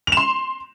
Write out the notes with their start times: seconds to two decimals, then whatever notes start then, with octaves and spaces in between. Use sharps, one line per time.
0.07 F7
0.12 E7
0.17 C6